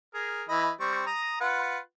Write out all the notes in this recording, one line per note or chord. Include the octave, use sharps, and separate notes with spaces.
G#4 A#4
E3 D#5 B5
G3 C4 C#6
A#5 D#6
F4 B4 F#5